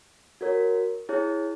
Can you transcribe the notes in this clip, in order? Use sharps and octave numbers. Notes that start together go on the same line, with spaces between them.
F#4 A#4 C#5
E4 G#4 C#5